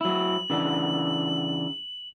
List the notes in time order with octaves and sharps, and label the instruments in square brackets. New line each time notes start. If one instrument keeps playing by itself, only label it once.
[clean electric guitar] F#3 E4 [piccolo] F#7
[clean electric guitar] C#3 E3 D4